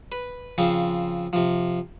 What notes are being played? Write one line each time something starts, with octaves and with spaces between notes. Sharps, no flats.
B4
C#3 F3 C4
C3 F3